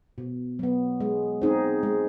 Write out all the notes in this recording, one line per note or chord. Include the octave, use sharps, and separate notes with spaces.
B2
F#3 B3
G#3
C4 D#4 G#4
G#3